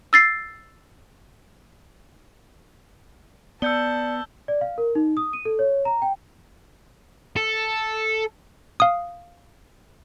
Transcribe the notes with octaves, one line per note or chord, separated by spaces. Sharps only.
E6 A6 C7
B3 D5 A5 E6 G6 C#7 G7
D5
F5
A#4
D#4
D#6
D#7
A4
C#5
A#5
G5
A4
F5 D#6